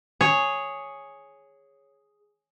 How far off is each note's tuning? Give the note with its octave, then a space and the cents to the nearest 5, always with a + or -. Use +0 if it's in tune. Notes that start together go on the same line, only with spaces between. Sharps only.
G#4 +0 C#5 +0